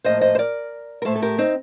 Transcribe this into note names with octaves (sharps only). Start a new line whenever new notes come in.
A2 F3 A#3 C5 D#5
C5 D#5
C5
A#4 D5
A#4
A2 A3 A4 C5
A4
G4 A#4
C4 D#4